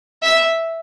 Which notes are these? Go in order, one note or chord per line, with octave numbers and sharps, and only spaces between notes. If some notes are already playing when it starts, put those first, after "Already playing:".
E5